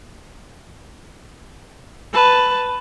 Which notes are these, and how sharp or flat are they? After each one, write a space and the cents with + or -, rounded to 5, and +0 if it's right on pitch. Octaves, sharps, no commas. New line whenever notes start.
B4 +10 A5 +0